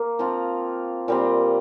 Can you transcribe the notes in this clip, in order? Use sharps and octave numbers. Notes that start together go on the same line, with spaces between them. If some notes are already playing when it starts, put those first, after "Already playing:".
Already playing: A#3
F3 C4 F4
A#2 G3 C4